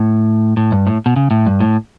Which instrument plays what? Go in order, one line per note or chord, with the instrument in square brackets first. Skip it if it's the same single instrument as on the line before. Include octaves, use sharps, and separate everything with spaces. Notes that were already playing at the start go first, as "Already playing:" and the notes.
Already playing: [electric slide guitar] A2
A2
G2
A2
B2
C#3
A2
G2
A2